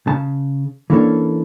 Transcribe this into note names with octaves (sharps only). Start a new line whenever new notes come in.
C#3 A5
E3 A#3 C#4 D4 A4 C#5